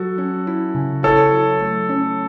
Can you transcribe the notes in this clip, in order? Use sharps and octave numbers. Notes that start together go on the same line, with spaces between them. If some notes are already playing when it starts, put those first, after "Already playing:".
Already playing: F#3 F#4 A4
C#4
E4
C#3
E4 A4 C#5
F#3
A3
C#4